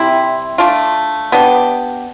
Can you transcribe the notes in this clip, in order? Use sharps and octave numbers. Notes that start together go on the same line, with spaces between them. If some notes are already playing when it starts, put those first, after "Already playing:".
Already playing: C3 G3 C4 E4
A3 D4 F4
B3 D4 G4